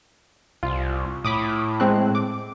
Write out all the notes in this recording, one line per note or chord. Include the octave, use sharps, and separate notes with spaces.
C2 F4
A2 B5 D6 D#6
G#3 C4 F#6
D6